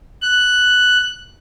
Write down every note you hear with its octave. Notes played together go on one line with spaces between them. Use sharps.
F#6